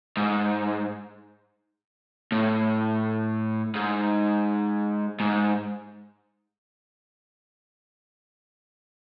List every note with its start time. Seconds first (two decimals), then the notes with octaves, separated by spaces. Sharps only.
0.17 G#2
2.32 A2
3.75 G#2
5.20 G#2